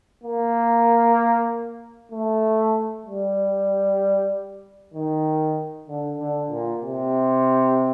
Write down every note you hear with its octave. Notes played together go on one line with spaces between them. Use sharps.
A#3
A3
G3
D#3
D3
D3
A#2
C3